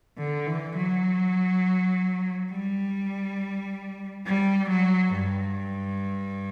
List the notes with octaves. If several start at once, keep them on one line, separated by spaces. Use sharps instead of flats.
D3
E3
F#3
G3
G3
F#3
G2